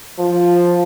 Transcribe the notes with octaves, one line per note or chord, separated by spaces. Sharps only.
F3